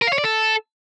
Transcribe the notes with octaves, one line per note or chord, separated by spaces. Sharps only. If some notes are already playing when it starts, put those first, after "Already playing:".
A#4
F5
C#5
D5
A4